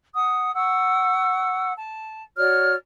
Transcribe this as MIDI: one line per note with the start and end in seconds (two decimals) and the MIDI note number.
0.15 0.52 78
0.15 0.52 87
0.55 1.72 78
0.55 1.72 85
0.55 1.72 88
1.76 2.23 81
2.37 2.74 66
2.37 2.74 73
2.37 2.74 74
2.37 2.74 89